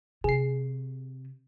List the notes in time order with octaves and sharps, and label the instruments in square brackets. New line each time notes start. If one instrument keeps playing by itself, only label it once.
[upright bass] C3 [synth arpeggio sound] G#4 C7